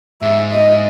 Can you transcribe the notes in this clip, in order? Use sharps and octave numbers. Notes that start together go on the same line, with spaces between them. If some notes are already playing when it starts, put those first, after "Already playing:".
G#2 E5
D#5